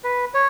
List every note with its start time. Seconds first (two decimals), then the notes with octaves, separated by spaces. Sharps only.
0.04 B4
0.34 C#5